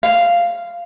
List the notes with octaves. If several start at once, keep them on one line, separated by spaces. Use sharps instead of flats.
F5